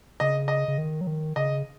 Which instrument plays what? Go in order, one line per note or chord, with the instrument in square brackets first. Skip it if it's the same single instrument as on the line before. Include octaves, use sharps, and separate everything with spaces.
[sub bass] C#3 [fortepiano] D#5
[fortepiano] D#5
[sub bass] C#3
D#3
F#3
D#3
[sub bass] C#3 [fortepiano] D#5